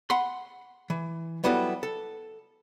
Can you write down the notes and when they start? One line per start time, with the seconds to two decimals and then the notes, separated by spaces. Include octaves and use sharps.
0.10 F#5 B5 C6
0.90 E3
1.44 F#3 G3 B3 E4 F#4 A4
1.83 A4